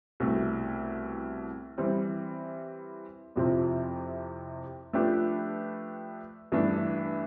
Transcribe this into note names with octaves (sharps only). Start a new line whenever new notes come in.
C2 B2 A3 E4
E3 G3 C4
F2 C3 F3 C4 E4
F3 A3 D4 G4 B4
G2 E3 A3 D4